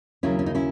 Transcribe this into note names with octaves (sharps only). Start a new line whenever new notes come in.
D#2 C#3 F#3 C#4 E4
C#4
D#4
C#4 E4